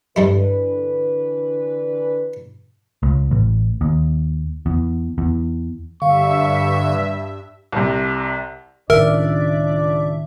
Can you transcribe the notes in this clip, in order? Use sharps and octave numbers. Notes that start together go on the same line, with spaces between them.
G2 D3 E3 G3 E4 B4
C#2
A1
D#2
E2
E2
G2 D3 E5 F5 C#6
C2 C3
C#2 A2 D#3 A3 D4 A#4 D5 E5